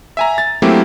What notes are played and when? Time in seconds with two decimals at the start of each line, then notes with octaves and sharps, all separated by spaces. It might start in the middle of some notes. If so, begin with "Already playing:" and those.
0.17 E5 G#5 A#5
0.38 A6
0.62 F#3 A3 A#3 C4 E4 G4